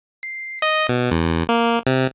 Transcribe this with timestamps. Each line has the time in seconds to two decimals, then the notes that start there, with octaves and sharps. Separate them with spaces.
0.23 C7
0.62 D#5
0.89 B2
1.11 E2
1.49 A#3
1.87 C3